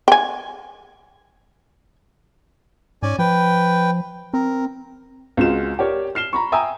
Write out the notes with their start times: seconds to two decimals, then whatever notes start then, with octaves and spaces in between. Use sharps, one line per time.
0.08 G5 G#5
3.03 G#2 C#4 D5 G#5
3.19 F3 B4 G5
4.34 C4 A#4
5.37 C#2 G#3 C4 F4 F#4 E7
5.79 G4 A#4 C#5 D5
6.15 F6 C7 E7 G7
6.33 A#5 B5 C#6
6.52 E5 G5 G#5 A#5 D#6 E6